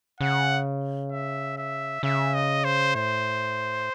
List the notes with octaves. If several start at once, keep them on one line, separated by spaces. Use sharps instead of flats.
C#3 F#5
E5
E5
C#3 E5
D#5
C5
A2 C5